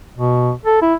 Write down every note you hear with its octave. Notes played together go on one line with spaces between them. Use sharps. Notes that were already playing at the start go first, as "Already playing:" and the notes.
B2
A4
E4